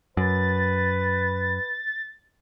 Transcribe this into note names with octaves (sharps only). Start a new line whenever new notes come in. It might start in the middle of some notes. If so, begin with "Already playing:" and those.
F#2 B4 A6